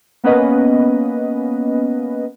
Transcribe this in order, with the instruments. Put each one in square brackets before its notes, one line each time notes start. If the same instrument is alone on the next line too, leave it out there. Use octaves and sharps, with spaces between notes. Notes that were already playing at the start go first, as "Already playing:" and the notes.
[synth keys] A#3 B3 C#4 B4 D#5